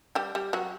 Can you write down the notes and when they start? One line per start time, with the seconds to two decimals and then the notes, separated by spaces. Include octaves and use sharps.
0.15 G3 G4
0.35 G3 G4
0.53 F#3 F#4